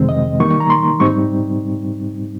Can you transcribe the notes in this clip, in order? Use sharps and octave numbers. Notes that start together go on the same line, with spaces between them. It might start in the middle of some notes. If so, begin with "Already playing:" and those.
Already playing: F2 C3 D#3 G#3 C4
D#5
D#3 G3 A#3 D#4 C#6
A#5
C6
G#2 G3 C4 D#4 C#6